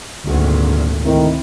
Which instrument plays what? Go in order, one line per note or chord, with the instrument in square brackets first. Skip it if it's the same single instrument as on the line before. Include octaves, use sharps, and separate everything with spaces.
[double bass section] G#1 D2 A#2 [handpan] D3 F#4
[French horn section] A2 D#3 [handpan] C3 C4 E4